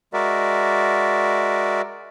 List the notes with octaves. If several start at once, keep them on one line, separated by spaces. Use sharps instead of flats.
G#3 F#4 A#4 D5 E5